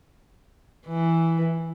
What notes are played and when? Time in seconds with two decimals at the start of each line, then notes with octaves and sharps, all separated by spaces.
0.87 E3